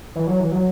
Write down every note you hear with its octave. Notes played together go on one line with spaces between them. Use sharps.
E3
F#3
E3
F#3